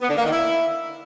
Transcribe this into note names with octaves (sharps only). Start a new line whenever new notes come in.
B3
D3
A#3
D#3
E4